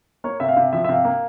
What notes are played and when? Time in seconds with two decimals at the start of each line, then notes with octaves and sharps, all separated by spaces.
0.24 A#3 C#5
0.40 C3 E5
0.48 F5
0.57 C3 E5
0.73 F3 E5
0.84 E5
0.89 C3 F5
1.05 A#3